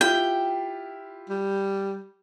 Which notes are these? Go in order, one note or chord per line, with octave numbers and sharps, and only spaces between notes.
E4 F4 G4 G5
G3